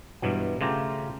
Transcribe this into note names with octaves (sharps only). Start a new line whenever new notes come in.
G2 B2 E3 F#3
C#3 A3 F4 G4 A#5